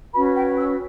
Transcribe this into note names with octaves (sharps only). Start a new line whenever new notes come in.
C#4 F#4 B4 B5
G5
E6